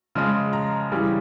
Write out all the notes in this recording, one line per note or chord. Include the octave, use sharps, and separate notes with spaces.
C#3 F3 G#3
A#5
C#3 E3 G3